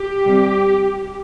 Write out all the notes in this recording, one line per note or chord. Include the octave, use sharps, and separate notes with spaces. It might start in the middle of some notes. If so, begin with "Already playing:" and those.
Already playing: G4
C3 G3